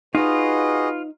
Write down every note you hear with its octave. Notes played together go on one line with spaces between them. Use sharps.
D#4 F4 F#4 G#4 B4 D#5